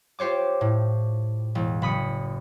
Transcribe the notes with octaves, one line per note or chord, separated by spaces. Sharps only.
F4 G4 C5 C#5 D6
A2
E1
F#1 B5 D#6 C#7